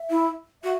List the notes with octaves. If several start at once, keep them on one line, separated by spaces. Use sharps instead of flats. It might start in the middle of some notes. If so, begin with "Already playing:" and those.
Already playing: E5
E4
F#4 E5